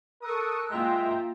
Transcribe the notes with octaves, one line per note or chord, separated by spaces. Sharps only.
A4 A#4 C#6 D#6 E6 F#6
G#3 A#3 F4 E5 G5 A#5